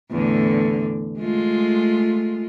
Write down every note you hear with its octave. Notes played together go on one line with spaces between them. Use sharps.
E2 A2 D3
G#3 A3 F4